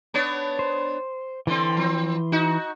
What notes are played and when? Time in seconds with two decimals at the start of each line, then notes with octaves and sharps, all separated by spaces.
0.14 B3 D4 C#5
0.59 C5
1.47 D3 E3 C4 C6
1.77 F3 C4
2.32 D#4 F#4